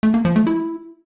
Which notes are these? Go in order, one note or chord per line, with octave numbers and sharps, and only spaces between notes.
A3
A#3
F3
A3
E4